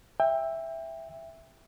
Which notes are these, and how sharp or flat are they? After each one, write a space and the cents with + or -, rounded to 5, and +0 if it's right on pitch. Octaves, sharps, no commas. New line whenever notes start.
E5 +0 G5 +25